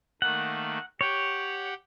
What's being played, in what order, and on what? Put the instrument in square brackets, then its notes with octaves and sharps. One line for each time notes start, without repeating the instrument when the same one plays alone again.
[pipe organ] D#3 A3 A#3 [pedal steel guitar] F#5
[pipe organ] G4 F#5 G5 [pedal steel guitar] C#5